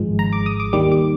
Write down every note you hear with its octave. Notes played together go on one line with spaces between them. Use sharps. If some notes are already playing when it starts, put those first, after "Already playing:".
Already playing: G#1 G#2 F3 G#3
A#5
D6
D#6
D6
D#2 D#3 G3 D6
D6